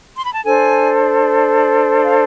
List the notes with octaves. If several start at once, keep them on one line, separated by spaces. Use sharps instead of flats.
C6
B5
A5
D4 A4 C5 G#5
F5